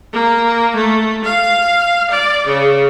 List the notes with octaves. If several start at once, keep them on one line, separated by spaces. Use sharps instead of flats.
A#3
A3
F5
D5
C#3